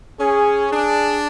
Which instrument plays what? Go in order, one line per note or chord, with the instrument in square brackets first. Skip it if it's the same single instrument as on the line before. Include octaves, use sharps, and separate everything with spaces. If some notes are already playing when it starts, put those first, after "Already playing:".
[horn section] C#4 [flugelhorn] G#4
[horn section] D4 [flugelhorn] G#4